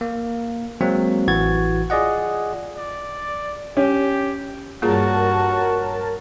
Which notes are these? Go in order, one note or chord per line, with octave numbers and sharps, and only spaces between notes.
A#3
F#3 G#3 A#3 C4
A1 E3 F#4 G#6 A6
F4 G#4 D5 D#5 F#5
D5
C#4 G4
G2 A#3 F4 F#4 G#4 A#4 C#5 A5